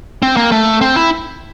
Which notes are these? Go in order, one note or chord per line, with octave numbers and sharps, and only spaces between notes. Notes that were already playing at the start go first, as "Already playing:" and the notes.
C4
A#3
A3
C4
E4